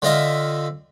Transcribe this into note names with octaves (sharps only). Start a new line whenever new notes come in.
D3 C4 F4 D#5 E5